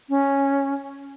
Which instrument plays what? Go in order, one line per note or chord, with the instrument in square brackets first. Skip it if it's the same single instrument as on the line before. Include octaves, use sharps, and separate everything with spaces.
[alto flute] C#4